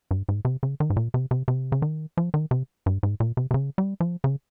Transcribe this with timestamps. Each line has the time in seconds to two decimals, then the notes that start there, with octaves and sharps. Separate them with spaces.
0.11 G2
0.29 G#2
0.45 C3
0.63 C#3
0.80 D#3
0.90 G#2
0.96 A#2
1.14 C3
1.31 C3
1.48 C3
1.72 C#3
1.82 D#3
2.17 F3
2.34 D#3
2.51 C3
2.86 G2
3.03 G#2
3.20 A#2
3.37 C3
3.51 C3
3.54 C#3
3.78 G3
4.00 F3
4.24 C#3